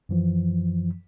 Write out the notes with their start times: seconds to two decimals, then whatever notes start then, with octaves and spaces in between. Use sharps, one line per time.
0.09 F#2 E3 F3